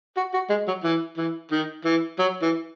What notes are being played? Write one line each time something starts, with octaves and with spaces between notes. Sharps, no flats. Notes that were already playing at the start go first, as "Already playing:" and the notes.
F#4
F#4
G#3
F#3
E3
E3
D#3
E3
F#3
E3